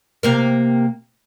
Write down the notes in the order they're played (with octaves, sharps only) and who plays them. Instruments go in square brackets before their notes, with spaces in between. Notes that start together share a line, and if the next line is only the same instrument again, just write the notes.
[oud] C3 A#3 A#4